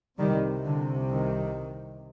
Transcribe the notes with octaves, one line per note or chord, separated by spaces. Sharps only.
C2 C3 D#3 G3
D3
D#3